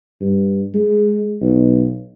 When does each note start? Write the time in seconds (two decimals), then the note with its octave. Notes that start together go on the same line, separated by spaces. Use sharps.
0.21 G2
0.74 G#3
1.42 B1